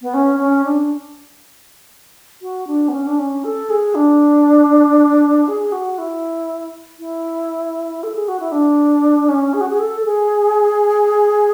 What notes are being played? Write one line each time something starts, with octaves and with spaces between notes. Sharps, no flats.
B3
C#4
C#4
D4
F#4
D4
B3
C#4
D4
C#4
A4
G#4
D4
G#4
F#4
E4
E4
A4
G#4
F#4
E4
D4
C#4
G#4
F#4
G#4
A4
A4
G#4